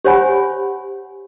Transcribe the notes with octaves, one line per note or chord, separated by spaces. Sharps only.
G4 C5 C#5 F#5 G#5 B5